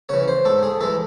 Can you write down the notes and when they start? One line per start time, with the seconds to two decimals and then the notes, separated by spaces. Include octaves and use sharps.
0.09 C#3 E3 C#5
0.28 C5
0.45 G#2 A4
0.63 G#4
0.81 E3 G#3 A4